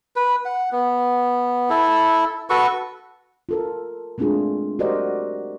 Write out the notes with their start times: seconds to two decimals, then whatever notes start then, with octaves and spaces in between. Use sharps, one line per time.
0.16 B4
0.45 F#5
0.72 B3
1.70 E4 A4
2.50 F#4 A4 B4 C#6
3.49 F4 A4 A#4
4.18 G#3 A3 C4 D4 F4 G#4
4.79 F#4 G4 A#4 C5 D5 D#5